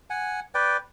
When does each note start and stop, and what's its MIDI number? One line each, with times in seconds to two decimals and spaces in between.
0.10 0.40 78
0.10 0.40 80
0.55 0.77 71
0.55 0.77 74
0.55 0.77 79